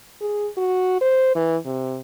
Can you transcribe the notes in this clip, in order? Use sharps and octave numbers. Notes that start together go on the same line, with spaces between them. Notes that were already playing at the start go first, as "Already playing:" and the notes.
G#4
F#4
C5
E3
C3